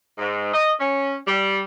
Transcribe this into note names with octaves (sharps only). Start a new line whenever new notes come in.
G#2
D#5
C#4
G3